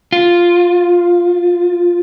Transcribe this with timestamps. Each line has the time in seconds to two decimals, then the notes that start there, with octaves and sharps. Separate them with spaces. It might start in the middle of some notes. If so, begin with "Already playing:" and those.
0.12 F4